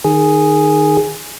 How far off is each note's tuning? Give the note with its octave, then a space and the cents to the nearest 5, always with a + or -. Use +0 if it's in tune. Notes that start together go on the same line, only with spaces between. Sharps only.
D#3 -20 G#4 +0